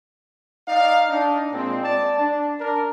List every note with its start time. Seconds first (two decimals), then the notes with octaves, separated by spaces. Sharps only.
0.68 D#4 D5 F5
1.09 D4 D#4
1.53 A#2 G#3 C4
1.83 D5 A5
2.19 D4
2.59 D4 A#4